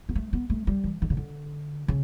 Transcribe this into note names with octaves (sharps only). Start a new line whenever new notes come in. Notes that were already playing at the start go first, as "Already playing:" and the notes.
B3
A3
B3
A3
G3
E3
D3
C#3
D3
C#3